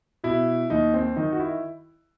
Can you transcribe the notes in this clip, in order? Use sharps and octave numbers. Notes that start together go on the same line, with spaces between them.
B2 E4
D#2 D#4
C4
D#3 D#4
F#4
E4